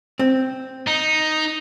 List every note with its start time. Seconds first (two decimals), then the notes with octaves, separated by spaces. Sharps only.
0.19 C4
0.88 D#4